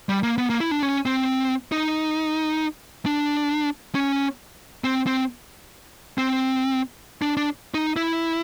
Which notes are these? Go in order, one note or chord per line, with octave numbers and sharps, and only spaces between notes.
G3
A#3
B3
A#3
E4
D4
C#4
C4
D#4
D4
C#4
C4
C4
C4
D4
D4
D#4
E4